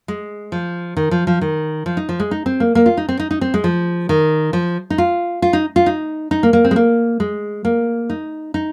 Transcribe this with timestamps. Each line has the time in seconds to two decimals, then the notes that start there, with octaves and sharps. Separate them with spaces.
0.08 G#3
0.52 F3
0.97 D#3
1.11 F3
1.27 F3
1.41 D#3
1.86 F3
1.97 D#4
2.09 F3
2.20 G#3
2.31 D#4
2.46 C4
2.60 A#3
2.75 A#3
2.86 F4
2.97 D#4
3.09 C4
3.19 D#4
3.31 D#4
3.41 C4
3.54 G#3
3.64 F3
4.09 D#3
4.53 F3
4.90 D#4
4.98 F4
5.42 F4
5.53 D#4
5.76 F4
5.86 D#4
6.31 D#4
6.43 A#3
6.53 A#3
6.65 C4
6.71 G#3
6.76 A#3
7.20 G#3
7.65 A#3
8.10 D#4
8.54 D#4